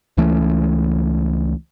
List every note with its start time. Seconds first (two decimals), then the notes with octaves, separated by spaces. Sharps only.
0.17 C#2 E3 A3 C#4